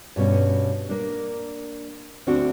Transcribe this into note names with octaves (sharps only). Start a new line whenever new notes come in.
G2 B2 C#4
A#3 D4
D2 C4 D4 F#4